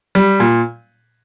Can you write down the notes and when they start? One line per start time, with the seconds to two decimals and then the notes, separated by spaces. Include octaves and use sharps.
0.15 G3
0.40 A#2